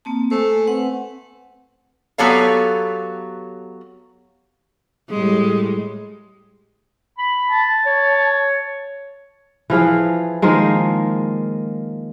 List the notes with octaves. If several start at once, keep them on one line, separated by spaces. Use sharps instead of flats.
A#3 C4 A5
A3 C5 G#5
C4 B4 F#5
F#3 B3 G4 A4 C#5 F5
A2 G3 G#3
B5
A5
C#5
E3 F3 G#4 F5
D#3 F3 G#3 A#3